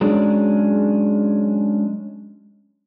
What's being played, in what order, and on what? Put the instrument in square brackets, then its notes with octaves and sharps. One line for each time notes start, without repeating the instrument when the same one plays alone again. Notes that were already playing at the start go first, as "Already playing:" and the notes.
[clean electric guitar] F#3 G#3 C#4 D4